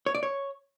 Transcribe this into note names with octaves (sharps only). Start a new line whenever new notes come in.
C#5
D5
C#5